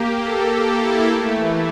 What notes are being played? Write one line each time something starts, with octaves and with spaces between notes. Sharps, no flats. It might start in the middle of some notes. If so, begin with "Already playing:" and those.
Already playing: A#3 G4
A4
E4
A3
E3